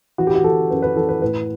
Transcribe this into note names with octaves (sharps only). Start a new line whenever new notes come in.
E3 F#4
G4
F#4
E3 A4
F#2 B4
B4
E3 A4
B4
A2 B4